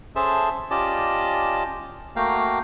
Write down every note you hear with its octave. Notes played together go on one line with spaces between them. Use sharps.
C#4 G#4 A4 C5 E5 A5
C#4 F4 G4 D5 D#5 A5
A3 A#3 F#4 F5 G5 A#5